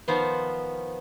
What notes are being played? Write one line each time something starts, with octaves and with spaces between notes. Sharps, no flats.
D#3 F3 B3 C5